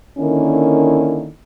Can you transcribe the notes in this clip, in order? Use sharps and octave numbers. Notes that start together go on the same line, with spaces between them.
D3 D#3 A#3 C#4 E4